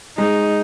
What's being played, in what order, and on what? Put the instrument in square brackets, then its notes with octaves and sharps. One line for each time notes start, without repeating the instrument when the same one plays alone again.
[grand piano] G#3 [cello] D#4